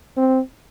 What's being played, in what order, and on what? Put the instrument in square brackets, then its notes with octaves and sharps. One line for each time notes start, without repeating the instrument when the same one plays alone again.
[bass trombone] C4